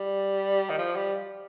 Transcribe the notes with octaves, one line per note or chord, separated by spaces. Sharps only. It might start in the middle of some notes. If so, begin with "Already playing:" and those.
Already playing: G3
D#3
F3
G3